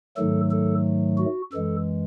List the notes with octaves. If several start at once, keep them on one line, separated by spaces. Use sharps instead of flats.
G#2 D#3 F#3 A3 A4
A4
F#4
F#2 E3 G#3 A4